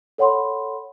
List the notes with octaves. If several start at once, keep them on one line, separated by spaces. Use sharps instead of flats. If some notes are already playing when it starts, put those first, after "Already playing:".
A4 C#5 F#5 B5 C6